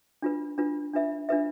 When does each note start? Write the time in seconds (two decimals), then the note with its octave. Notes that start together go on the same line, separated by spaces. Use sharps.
0.22 D4 F4 B4
0.58 D4 F4 B4
0.93 D4 F4 B4 E5
1.29 D4 F4 B4 E5